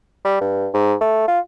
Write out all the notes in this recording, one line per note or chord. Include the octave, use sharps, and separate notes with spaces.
G3
G2
G#2
A3
F4